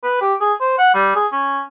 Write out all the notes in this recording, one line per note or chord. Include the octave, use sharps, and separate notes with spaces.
B4
G4
G#4
C5
F#5
G3
G#4
C#4